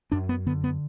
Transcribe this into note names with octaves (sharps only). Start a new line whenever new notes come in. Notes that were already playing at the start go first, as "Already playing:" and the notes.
F#2 D4
B3
D3 B3
B3